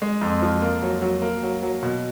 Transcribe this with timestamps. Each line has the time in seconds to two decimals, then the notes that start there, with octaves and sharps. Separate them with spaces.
0.02 G#3
0.21 F2
0.42 F3
0.62 A#3
0.82 F#3
1.02 F#3
1.22 A#3
1.43 F#3
1.63 F#3
1.83 B2